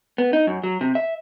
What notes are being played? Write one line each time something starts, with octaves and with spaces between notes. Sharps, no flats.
B3
D#4
F#2
F#3
C3
E5